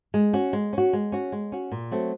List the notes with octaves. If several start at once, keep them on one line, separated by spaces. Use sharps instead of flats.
G#3
C#4 F#4
G#3
C#4 F#4
G#3
C#4 F#4
G#3
C#4 F#4
A#2
F#3 A3 C4